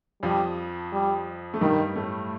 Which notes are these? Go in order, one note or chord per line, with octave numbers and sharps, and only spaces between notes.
F2 F3 G3
G3
A3
G2 D#3 G3
A2 A3